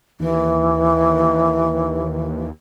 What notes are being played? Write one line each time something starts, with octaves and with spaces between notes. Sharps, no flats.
D#2 E3